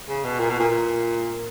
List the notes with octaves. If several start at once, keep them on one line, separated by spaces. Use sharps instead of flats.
C#3
B2
A#2
B2
A#2
A#2